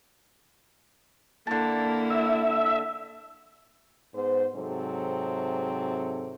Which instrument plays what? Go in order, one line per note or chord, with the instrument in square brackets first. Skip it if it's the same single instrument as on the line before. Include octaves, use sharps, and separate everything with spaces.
[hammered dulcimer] D3 A5 [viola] A#3 E4
[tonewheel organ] E5
[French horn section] G#2 B3 C5
G#2 C3 F#3 C4 A4